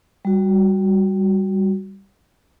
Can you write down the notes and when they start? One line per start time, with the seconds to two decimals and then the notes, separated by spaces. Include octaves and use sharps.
0.25 G3 F#4